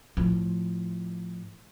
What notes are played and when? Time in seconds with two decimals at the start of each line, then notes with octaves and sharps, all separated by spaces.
0.17 A2 F3